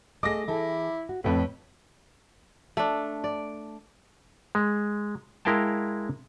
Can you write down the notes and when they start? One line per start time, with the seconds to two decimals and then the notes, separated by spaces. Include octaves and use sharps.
0.23 A3 G#4 D#5 D6 A#6
0.48 E3 E4 G#4 A4
1.09 F#4
1.24 F2 A2 B3 A#4 B4 C#5
2.77 A3 D4
3.24 D5
4.55 G#3
5.45 G#3 E4 A#4 F5 G5 A5